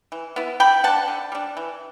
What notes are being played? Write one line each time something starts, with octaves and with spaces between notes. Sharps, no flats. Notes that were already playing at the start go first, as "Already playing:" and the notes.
E3
B3 E4
D3 G5 B5
G3 D4 F#5 A5
D3
G3 D4
E3